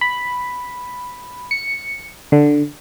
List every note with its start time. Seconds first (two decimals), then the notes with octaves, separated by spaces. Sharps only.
0.01 B5
1.51 C#7
2.32 D3